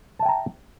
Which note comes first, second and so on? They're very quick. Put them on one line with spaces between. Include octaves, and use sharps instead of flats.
A5 E5 G5 A#5